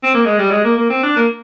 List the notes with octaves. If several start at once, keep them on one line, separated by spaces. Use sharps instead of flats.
C4
A#3
G#3
G3
G#3
A#3
A#3
C4
D4
A#3